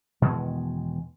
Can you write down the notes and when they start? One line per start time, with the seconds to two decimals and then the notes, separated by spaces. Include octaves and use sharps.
0.22 E2 B2 D#3 G#3